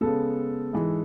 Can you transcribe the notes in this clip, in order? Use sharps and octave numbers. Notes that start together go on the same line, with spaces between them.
C#3 G#3 B3 A4
G#2 E3 G#3